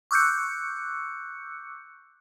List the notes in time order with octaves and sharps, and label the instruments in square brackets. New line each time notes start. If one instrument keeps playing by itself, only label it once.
[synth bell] C#6 D6 E6 F#6 G6 C#7